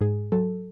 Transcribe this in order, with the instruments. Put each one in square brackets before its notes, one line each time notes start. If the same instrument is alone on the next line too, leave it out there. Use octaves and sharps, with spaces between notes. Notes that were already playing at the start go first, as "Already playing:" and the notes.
[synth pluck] G#2 G#4
F#3 A4